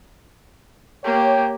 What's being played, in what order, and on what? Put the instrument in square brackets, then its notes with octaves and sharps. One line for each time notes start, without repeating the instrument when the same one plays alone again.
[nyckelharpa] A#3 G4 [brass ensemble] C#5 G5